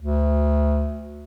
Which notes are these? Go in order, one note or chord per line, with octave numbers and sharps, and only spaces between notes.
D2